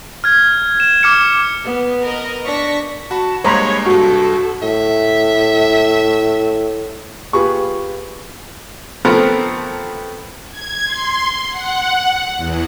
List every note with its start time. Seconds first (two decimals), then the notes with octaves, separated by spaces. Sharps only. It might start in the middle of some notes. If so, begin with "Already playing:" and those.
0.24 F6 G#6
0.80 E7
1.03 D6 F6 C#7
1.65 B3
2.01 A#4 B4 D#5
2.46 D4 C#6 A#6 B6
3.11 F#4 A5 B5
3.44 G2 G#3 A#3 C5 C#5 A#5 B5
3.86 C2 G2 F#4 A4
4.62 A2 E5
7.33 F4 G4 G#4 B4 C#6
9.05 F3 A3 B3 C4 A#4
10.51 G#6
10.85 C6
11.50 F#5
12.36 E2